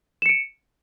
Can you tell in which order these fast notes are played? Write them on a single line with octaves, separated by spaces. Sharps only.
E7 C#7 D7